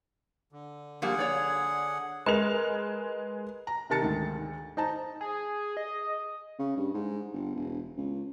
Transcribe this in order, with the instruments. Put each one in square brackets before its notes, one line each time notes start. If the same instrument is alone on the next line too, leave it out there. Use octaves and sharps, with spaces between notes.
[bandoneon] D3
[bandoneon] D3 G#4 F#5 [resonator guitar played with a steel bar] F3 G3 A#3
[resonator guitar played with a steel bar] C#5 D5
[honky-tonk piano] G#3 A#4 F7 [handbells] B4
[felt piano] A#5
C3 D#3 A#4 A5 A6 C#7
D2 G#2 D#3
D#4 C5 A5 A#5
[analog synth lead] G#4
D#5
[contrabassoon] C#3
G2
G#2
G1
E1
C#2